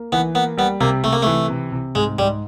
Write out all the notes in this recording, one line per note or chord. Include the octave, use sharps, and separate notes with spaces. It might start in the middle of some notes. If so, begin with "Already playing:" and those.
Already playing: A#3
E3 B3
A#3 B3
G3 B3
C3 A#3
C3 A3
A#3
E3 A3
C3
C3
G#2 G#3
G#2 G3